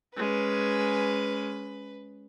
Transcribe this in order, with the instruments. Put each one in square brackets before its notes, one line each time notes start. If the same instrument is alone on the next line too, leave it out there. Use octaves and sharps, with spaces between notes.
[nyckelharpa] G#3 C#4 [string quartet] B4